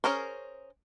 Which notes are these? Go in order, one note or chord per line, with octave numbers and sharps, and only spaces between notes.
C#4 G#4 A#4 C5